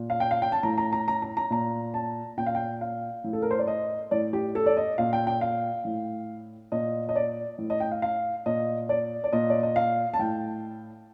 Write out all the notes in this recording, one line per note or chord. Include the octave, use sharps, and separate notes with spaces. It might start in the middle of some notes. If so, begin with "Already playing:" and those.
Already playing: A#2
F5
G5
F5
G5
A5
A2 A#5
A#5
A#5
A#5
A#5
A#5
A#2 A#5
A5
A#2 G5
F5
G5
F5
A2
A4
A#4
C5
D5
D#5
A2 D5
G4
A4
D5
D#5
A#2 F5
G5
G5
F5
A2
A#2 D#5
D#5
D5
A2
D#5
G5
F5
F5
A#2 D#5
D5
D5
A#2 D#5
D5
D#5
F5
A5
A2 G5